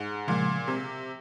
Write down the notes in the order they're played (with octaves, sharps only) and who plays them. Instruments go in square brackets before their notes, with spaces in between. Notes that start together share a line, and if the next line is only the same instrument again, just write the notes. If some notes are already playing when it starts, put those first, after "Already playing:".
Already playing: [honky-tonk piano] G#2
[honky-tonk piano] A#2 [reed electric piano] C#3 F3 G#3
[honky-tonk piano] C3